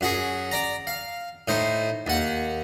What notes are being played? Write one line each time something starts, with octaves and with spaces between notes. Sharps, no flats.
F#2 F#4 G#4
D5 A#5
F5
A2 D#4 C5
D#2 F#5